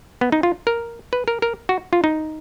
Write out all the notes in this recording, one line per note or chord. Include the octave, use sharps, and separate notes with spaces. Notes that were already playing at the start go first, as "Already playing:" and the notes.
B3
D#4
F4
A#4
B4
A#4
A#4
F#4
F4
D#4